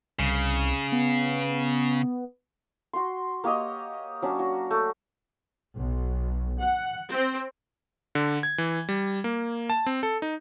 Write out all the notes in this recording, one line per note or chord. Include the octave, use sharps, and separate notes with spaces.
C2 C#3
B3
F#4 C6
A#3 G4 C#5 D#5
F#3 C#4 D4
F#4
A3
B1
F#5
C4
D3
G#6
E3
G3
A#3
A5
C4
A4
D#4